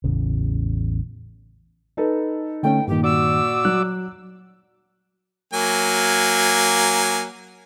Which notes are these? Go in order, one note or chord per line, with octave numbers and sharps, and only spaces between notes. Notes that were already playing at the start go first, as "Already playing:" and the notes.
A1 E2 C#3
D#4 A4 B4
D3 A3 C#4 G5
G2 A#2 D#3 G4
F#4 D5 D6 E6
F#3 F#6
F#3 A#3 G#5